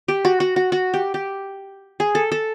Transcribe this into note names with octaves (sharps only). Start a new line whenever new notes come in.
G4
F#4
F#4
F#4
F#4
G4
G4
G#4
A4
A4